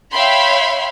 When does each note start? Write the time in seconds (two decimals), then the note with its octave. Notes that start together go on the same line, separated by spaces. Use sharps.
0.12 C#5 E5 F5 G5 B5 C6